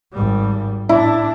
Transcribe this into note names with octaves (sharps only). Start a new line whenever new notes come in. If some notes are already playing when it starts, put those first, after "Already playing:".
G#1 G3
A2 D4 E4